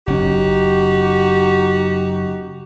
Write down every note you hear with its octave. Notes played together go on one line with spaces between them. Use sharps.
F#1 C#4 D#4 F#4 G4